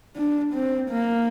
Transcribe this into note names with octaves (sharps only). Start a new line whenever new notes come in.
D4
C4
A#3